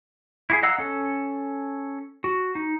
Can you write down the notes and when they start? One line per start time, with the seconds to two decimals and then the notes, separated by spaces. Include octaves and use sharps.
0.50 E4 F#4 G#4
0.63 D#5 F5 F#5 A#5 E6
0.78 C#4 A4
2.24 F#4
2.55 D#4